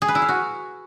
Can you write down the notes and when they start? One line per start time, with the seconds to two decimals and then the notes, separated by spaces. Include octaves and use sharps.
0.02 G#4
0.08 B4
0.15 E4
0.22 F5
0.29 F#4